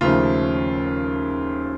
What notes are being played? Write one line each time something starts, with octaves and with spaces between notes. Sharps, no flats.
D#2 C#3 F3 A3 F4